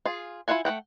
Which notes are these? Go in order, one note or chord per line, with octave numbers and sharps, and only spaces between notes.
F4 G#4
E4 F4 E5 F#5 G#5
A3 A#3 F#5 G5